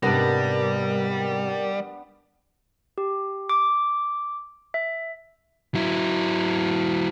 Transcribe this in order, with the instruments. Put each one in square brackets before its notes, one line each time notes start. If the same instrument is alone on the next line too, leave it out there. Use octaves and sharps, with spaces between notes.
[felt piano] G#2 C3 [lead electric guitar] G3 [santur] B3 D4 [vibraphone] A#4
[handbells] G4
D6
E5
[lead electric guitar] F#3 E4